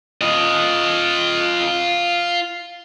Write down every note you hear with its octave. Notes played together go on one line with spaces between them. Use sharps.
F4 D#5